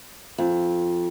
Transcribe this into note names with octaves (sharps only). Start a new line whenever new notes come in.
F2